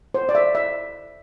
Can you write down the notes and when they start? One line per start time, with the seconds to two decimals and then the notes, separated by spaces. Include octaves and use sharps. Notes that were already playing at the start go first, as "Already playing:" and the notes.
0.14 C5
0.29 D5
0.35 E5
0.55 E5